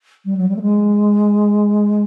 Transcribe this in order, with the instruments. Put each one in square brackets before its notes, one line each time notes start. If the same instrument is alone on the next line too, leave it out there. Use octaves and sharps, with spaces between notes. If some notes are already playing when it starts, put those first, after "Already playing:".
[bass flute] G3
F#3
G3
A3
G#3